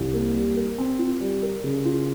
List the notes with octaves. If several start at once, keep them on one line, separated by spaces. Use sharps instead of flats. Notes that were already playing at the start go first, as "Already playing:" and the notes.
Already playing: C2
A#3
G3
A#4
C4
F4
G3
A#4
C#3
F4